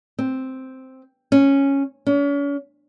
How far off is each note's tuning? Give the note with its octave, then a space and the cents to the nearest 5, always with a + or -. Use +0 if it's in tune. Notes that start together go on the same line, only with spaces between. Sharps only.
C4 +0
C#4 -5
C#4 +40